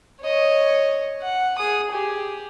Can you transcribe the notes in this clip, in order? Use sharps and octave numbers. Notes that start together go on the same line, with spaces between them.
C#5 D#5
F#5
G#4 D#6
G4 G#4